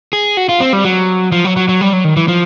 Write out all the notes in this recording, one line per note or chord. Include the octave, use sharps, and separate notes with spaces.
G#4
F#4
F4
C4
G3
F#3
F3
F#3
F#3
F#3
G3
F#3
D#3
E3
F3